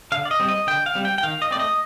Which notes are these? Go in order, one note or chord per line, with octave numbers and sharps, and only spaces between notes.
D3 F5
D5
D#5
G3 C4
D#5
D3 G5
F5
G3 C4
G5
G5
D#3 F5
D#5
A3 C4 D5 D#5